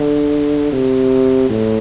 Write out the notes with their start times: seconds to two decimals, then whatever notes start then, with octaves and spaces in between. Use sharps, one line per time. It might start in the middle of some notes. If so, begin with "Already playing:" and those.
Already playing: D3
0.72 C3
1.50 A2